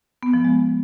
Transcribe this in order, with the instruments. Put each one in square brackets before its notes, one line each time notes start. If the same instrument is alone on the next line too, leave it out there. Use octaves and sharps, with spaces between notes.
[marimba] B3
F3
G#3